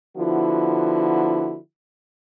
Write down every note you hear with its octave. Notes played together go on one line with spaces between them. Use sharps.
D3 F3 B3 E4 F#4